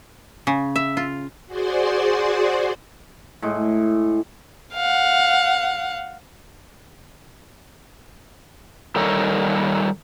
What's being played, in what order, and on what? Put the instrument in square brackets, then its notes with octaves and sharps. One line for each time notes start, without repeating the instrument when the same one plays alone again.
[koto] C#3
E5
F4
[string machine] F#4 G#4 C5 D5 C6
[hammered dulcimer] A2 G#3
[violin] F5 F#5
[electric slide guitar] D#3 G3 A4 A#4 C#5